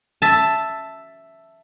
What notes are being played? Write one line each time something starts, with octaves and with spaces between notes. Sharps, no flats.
E5 A5